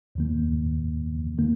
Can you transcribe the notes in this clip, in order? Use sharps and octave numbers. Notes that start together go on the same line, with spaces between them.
D#2 D#3 A#3
D#3 A#3